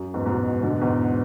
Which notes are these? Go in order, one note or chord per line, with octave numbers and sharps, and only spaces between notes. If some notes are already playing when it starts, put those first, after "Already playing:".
Already playing: F#2
E2 G#2
G#2 B2
B2 D3
E2 G#2